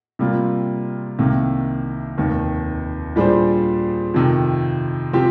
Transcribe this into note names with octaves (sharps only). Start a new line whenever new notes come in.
C3 G3 A#3 F4
C2 C3 D#3 A#3
F1 D#2 D#3
A#2 G3 D4 G#4 C5
F2 C3 D#3
C3 F3 C4 G4